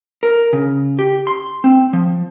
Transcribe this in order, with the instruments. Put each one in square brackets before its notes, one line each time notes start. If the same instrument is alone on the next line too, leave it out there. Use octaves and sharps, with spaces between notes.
[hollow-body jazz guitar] A#4
C#3
G4
C6
C4
F3